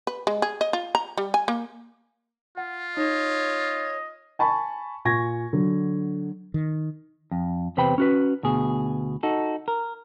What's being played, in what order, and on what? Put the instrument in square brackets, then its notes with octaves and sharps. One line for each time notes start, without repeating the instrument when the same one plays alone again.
[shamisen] B4
G#3
G#4
D#5
F4
A#5
G3
G#5
A#3
[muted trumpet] F4 [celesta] F#5
[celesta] D#4 [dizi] C#5 [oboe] D#5
[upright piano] G#5 A5 B5 C#6
A#2 G#5 C#6 G#6 A#6
D3 F#3
[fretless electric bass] D#3
[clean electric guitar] F2
E2 C3 B4 C5 G5 B5
C#4 F#4 B4
D2 B2 G#4
D#4 F#4 A4
A#4